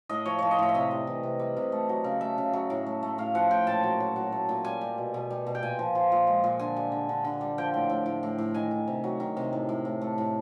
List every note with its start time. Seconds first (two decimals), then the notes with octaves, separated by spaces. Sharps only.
0.09 A2 D#5
0.25 F3 C#5
0.39 F3 C#5
0.51 D#5
0.59 A2 E5
0.69 E5
0.74 C3 D#5
0.91 G3
1.07 E3
1.23 C3
1.39 G3
1.57 C3
1.72 A3
1.89 F#3
2.04 C#3
2.21 A3 E5
2.38 C#3
2.53 F#3
2.70 A2
2.86 A3
3.03 A3
3.18 A2 F5
3.35 F3 F#5
3.50 A2 G5
3.67 A#2 A5
3.83 F#3
4.00 F#3
4.16 F#3
4.32 A3
4.49 A#2
4.64 G3 G#5
4.81 G3
4.98 B2
5.14 B2
5.31 G3
5.47 B2
5.55 G5
5.62 A#2 G#5
5.79 F3
5.95 F3
6.12 A#2
6.27 G#3
6.44 A#2
6.59 D3 G#5
6.76 G3
6.92 D3
7.09 D3
7.24 D3
7.41 G3
7.58 F3 G5
7.74 A2
7.90 A2
8.06 A2
8.23 A2
8.38 A2
8.54 D#3 G#5
8.71 D#3
8.88 C3
9.04 F#3
9.20 D#3
9.37 C3
9.53 A2
9.69 A2
9.85 A2
10.01 A3
10.18 A2